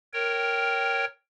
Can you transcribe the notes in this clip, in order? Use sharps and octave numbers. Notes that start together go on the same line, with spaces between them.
A#4 C#5 G5